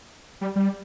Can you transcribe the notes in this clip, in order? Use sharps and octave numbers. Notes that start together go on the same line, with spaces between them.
G3
G3